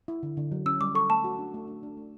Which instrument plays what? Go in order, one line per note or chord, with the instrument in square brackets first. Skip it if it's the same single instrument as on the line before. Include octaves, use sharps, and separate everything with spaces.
[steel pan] E4
D3
D3
F#3
[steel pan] C#4 [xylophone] E6
[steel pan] G3 [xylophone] D6
[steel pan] A4 [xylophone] C#6
[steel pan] A3 [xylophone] A5
[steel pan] F#4
D4
A3
D4
D4
A3